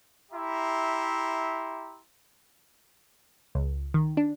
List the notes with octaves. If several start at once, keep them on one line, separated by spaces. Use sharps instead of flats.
E4 G4 E5 A#5 C6
C#2
D#3
D4